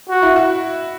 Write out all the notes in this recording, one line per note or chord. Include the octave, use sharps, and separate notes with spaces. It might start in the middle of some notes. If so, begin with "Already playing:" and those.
F#4
E4
F#4